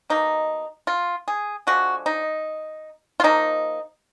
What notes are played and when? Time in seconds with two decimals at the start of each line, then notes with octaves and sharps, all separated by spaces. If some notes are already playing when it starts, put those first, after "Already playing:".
0.10 B2 A#3 D#4
0.87 F4
1.28 G#4
1.67 D3 F3 G#3 F#4
2.06 D#4
3.20 F4
3.24 F3 A#3 D#4